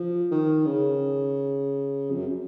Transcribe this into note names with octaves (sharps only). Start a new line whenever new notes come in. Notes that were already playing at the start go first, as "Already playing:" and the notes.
Already playing: F3
D#3
C#3
F2
F#2